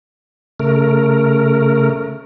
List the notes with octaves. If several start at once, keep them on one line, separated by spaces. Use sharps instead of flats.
C#3 A3 A#4